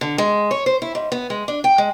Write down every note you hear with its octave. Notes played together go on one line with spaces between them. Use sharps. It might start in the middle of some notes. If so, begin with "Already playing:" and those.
D3
G#3
C#5
C5
E4
G#2
B3
G#3
D4
G5
G#3